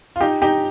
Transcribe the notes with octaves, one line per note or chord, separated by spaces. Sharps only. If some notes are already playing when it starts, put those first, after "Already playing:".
F4
D#4 G4
D#4 G4